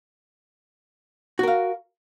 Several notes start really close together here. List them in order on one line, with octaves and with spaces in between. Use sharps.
F#4 A#4 F5